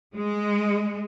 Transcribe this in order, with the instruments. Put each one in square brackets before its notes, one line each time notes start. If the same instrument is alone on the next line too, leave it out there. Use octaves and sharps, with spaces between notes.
[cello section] G#3